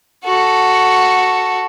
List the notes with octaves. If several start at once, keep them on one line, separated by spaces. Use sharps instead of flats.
F#4 A4